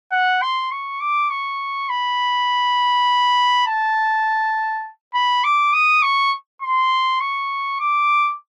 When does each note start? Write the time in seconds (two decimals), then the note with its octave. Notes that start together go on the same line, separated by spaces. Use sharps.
0.12 F#5
0.42 C6
0.71 C#6
1.01 D6
1.30 C#6
1.89 B5
3.67 A5
5.14 B5
5.44 D6
5.73 D#6
6.02 C#6
6.62 C6
7.20 C#6
7.80 D6